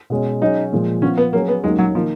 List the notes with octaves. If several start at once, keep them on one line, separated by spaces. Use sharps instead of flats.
B2 G#3 C#4
F#3 C#4 D#4 G#4
A#2 F3 G#3
F3 B3 C#4 F4
B3
F#3 A#3 C#4 G#4
B3
D#2 D#3 F#3 G#3 A#3 C#4
F#3
D#3 F3 A#3